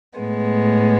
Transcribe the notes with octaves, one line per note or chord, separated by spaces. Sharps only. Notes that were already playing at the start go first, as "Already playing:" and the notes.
A2 G#3 B3